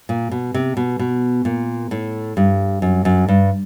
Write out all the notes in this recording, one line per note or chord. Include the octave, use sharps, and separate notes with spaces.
A#2
B2
C3
B2
B2
A#2
A2
G2
F#2
F#2
G2